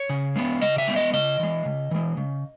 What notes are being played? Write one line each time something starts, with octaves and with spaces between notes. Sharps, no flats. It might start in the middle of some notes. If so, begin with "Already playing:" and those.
Already playing: C#5
C#3
G#3 B3
C#3 D#5
E5
G#3 B3
D#5
C#3 D#5
E3 G#3
C#3
E3 G#3
C#3